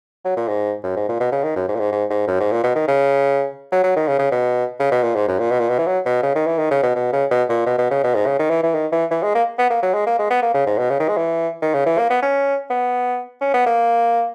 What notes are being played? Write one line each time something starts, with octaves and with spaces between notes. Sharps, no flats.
F#3
A#2
G#2
F#2
G#2
A#2
B2
C#3
D#3
F#2
G#2
A#2
G#2
G#2
G#2
F#2
G#2
A#2
B2
D#3
C#3
F#3
F#3
D#3
C#3
C#3
B2
C#3
B2
A#2
G#2
F#2
A#2
B2
A#2
B2
E3
F#3
B2
C#3
D#3
E3
D#3
C#3
B2
B2
C#3
B2
A#2
B2
B2
C#3
B2
G#2
C#3
D#3
E3
E3
D#3
E3
E3
G#3
A#3
B3
A#3
F#3
G#3
A#3
G#3
B3
A#3
C#3
G#2
B2
C#3
D#3
G#3
E3
D#3
C#3
E3
A#3
B3
C#4
B3
C#4
B3
A#3